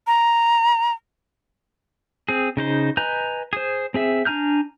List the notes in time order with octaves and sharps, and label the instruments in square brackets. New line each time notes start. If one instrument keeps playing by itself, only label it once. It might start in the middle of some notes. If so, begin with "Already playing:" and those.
[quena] A#5
[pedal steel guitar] C4 G#4
C#3 D#4 C5
B4 D#5 G#5 A#5 G6
G#4 C5
C4 G#4 E5
D4 G#5 A#5 F6 G6